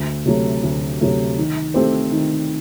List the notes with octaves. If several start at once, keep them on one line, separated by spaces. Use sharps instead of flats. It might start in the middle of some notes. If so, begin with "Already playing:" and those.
Already playing: D2
C3 F#3 A3
D2
C3 F#3 A3
D#3
A3 C4 G4 C5
D#3